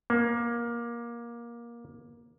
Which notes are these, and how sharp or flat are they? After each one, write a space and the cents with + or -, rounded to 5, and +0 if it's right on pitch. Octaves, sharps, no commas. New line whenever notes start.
A#3 +20